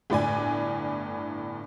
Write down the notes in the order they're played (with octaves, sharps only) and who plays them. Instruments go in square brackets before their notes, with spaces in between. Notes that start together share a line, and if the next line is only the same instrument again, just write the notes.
[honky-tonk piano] G1 A2 D5 G#5